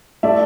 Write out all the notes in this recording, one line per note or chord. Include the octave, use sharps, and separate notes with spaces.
A3 D5 E5